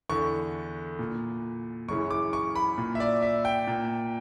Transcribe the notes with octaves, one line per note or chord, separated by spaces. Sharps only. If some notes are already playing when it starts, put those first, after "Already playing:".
E2 D3 C#6
A#2
F#2 C#3 E3 C#6
D6
C#6
B5
A#2
E5
D5
E5
G5
A#2